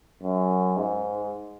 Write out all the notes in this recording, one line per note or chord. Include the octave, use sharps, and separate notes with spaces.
F#2
G#2